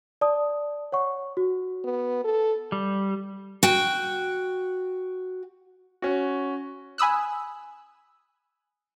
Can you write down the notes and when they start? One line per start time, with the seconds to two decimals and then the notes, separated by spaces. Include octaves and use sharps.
0.21 D5 A5 D#6
0.92 C#5 F#5 C#6
1.37 F#4
1.84 B3
2.25 A4
2.72 G3
3.63 F#4 G5
6.02 C#4 F#4
6.98 G#5 B5 D#6 E6 F#6